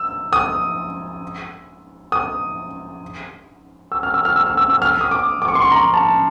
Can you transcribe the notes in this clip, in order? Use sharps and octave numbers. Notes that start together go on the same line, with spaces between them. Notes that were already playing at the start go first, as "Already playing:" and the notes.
Already playing: E6
D#6
D#6
E6
F6
E6
F6
E6
F6
E6
E6
F6
D#6
D6
D6
C#6
C6
C#6
A#5
A5